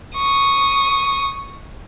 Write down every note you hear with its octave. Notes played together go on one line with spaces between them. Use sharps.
C#6 D#6